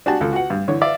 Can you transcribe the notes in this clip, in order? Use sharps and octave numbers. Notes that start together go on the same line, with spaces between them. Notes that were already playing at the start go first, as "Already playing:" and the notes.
D4 F#4 G4 G#5 A5
C#2 A4
F#4 F#5
G2
D3 E3 C#5
D5 E5 F5